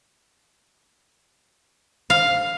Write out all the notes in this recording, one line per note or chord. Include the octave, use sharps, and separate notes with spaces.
F5